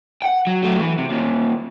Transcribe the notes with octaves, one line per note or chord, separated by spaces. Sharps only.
F#5 G5
F#3
F#3 A3
E3
C3
D#2 A#2